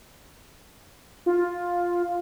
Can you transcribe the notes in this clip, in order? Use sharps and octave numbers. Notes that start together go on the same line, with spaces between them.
F4